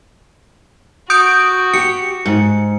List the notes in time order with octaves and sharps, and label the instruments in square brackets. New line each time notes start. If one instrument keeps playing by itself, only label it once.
[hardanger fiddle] F#4 [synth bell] D#6 G6 D7
[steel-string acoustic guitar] G4 [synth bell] C#7
[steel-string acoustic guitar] G#2